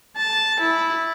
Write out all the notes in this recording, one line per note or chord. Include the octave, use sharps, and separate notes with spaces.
A5
E4